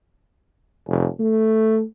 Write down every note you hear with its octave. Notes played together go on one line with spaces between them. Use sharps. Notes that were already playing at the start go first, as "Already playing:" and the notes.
F1
A3